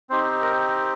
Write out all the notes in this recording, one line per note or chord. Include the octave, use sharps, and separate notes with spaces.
C4 D#4 G4 C5
A#4